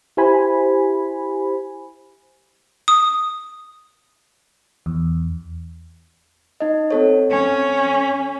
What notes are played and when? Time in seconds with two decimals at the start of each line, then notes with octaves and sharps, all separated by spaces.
0.17 E4 G4 C5 G#5 B5
2.88 D#6
4.86 E2
6.60 D#4 D#5
6.91 C4 A4 C#5
7.31 C#4